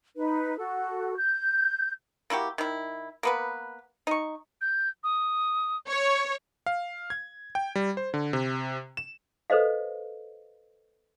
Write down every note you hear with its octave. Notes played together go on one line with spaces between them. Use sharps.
D#4 B4
F#4 A4
G6
A#3 E4 F#4 G4
D#3 E4
A#3 B3 B4
D#4 C#6
G6
D#6
C#5 C#6
F5
G#6
G5
G3
C5
D3
C3
E7
A4 B4 C5 D#5 F5